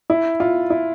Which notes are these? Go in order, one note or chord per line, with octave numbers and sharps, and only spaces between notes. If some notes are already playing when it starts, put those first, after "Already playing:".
E4
F4
E4